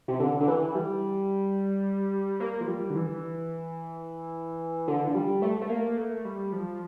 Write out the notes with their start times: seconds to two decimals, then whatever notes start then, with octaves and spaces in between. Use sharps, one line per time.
0.08 C3
0.20 D3
0.40 D3
0.48 E3
0.75 G3
2.40 A#3
2.61 F3
2.67 G3
2.90 D3
2.95 E3
4.88 D3
5.07 F3
5.15 G3
5.42 A3
5.61 A3
5.69 A#3
5.98 A3
6.25 G3
6.53 F3